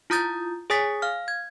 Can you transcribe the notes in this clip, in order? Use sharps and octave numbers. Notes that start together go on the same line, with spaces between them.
E4 F4 A#5 D#6 G6 A6
G#4 C#5 G#5 D#6 A6 B6
F5 F6
G#6